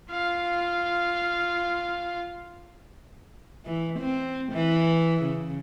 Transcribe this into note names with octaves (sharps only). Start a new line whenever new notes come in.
F4 F5
E3
C4
E3
C#3